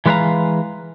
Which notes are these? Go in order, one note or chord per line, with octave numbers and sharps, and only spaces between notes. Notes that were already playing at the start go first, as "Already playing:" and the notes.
E3 G#3 B4 C#5 F5 A#5